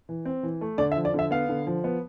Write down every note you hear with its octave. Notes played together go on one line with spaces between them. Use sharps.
E3
C4
E3
A3
D3 D5
E5
F3
D5
D3 E5
B3 F5
D3
F3
B3